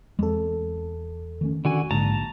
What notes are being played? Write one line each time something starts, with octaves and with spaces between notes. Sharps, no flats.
E2 G#3 C4 A4
D#3 A3 C#4
D3 D#3 F#4 G#5
A#1 G#2 D3 A5 A#5